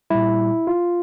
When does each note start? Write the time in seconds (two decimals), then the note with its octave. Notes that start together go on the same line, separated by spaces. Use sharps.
0.10 A#2 G3 E4
0.67 F4